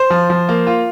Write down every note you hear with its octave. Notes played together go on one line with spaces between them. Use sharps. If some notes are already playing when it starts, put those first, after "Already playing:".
Already playing: C5
F3
F3
A#3
F4